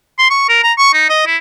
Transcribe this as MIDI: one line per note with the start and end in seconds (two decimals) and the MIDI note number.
0.18 0.30 84
0.30 0.48 85
0.49 0.59 70
0.63 0.72 82
0.77 0.92 85
0.93 1.09 63
1.09 1.23 75
1.26 1.37 64